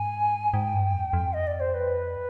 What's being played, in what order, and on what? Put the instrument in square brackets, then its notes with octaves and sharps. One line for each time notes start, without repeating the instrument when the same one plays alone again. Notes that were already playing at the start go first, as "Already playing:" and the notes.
Already playing: [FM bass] G#2 [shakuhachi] G#5
[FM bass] G#2 [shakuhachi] G5
[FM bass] G2
F2
F2
[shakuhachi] D#5
D5
C5
B4